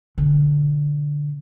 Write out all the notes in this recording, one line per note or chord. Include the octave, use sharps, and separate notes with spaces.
B2 D3